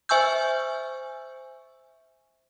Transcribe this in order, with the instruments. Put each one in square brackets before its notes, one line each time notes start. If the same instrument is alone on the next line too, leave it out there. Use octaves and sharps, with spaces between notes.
[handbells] C5 E5 G#5 C#6 E6 G6